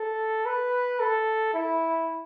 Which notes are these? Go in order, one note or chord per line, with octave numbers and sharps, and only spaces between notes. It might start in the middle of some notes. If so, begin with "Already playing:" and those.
Already playing: A4
B4
A4
E4